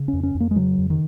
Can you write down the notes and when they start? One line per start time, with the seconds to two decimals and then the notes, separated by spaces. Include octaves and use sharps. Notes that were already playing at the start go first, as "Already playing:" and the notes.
Already playing: C#3
0.08 C#4
0.13 F2
0.23 C#4
0.35 F2
0.40 A#3
0.51 G#3
0.56 C#3 F#3
0.79 F2
0.90 D#3